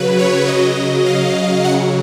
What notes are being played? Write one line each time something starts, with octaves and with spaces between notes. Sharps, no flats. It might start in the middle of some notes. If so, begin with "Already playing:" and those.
Already playing: C#3 F#3 B4
C#5
C#3 F#3 D#5
F5
C#3 F#3 F#5